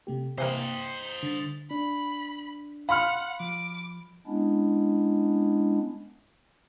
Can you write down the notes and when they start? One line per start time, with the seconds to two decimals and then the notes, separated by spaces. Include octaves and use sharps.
0.07 C3 A3 G4
0.38 C3 E3 A#3 C5 D#5 G5
1.23 D3 A6
1.71 D4 B5
2.89 F5 F#5 B5 C6 F6
3.40 F3 D6
4.27 G#3 B3 C#4 D4 E4